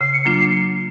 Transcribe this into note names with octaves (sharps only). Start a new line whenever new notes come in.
C#3 C7
C#7
F#3 A#3 D4 F4 C7